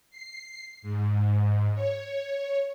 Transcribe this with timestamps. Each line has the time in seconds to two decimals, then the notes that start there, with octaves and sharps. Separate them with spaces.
0.11 C7
0.82 G#2
1.74 C#5